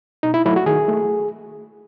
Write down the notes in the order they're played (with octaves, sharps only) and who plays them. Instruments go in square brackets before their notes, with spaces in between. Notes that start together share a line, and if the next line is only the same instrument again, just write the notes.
[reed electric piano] B2 D#4
E4
F#3 A3 E4
F#4
D#3 G#4
A3